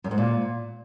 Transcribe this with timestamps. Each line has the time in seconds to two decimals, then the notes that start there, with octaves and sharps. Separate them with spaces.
0.04 F#2
0.11 G#2
0.18 A#2